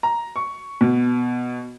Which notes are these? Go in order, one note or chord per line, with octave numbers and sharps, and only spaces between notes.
A#5
C#6
B2